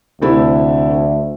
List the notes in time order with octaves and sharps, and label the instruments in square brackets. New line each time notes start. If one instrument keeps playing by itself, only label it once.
[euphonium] D2 [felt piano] C3 A3 E4